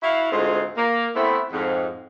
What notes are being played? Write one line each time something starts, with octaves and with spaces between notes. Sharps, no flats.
E4 F#4 F5
D2 G#2 G#3 C4 F4 G#4
A#3
A3 B3 C4 E4
F2 G#2